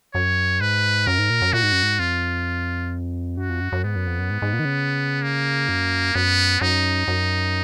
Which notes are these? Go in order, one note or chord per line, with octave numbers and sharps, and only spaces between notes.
F#2 C#5
G#2 B4
F#2 A#4
G#2
A#2
F#2
A#2 F#4
G#2
F#2
G#2
F2 F4
F#2 F#4
F2
F#2
F#2
G#2 B3
F#2
F2
F#2
G#2
G#2
A#2
D#3
C#3
A#3
F#2
F#2 B3
F#2 D#4
F#2